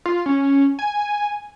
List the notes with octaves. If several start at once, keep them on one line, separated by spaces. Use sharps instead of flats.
F4
C#4
G#5